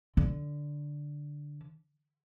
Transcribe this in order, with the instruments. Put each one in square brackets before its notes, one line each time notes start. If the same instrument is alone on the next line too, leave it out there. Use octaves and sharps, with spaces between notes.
[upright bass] D3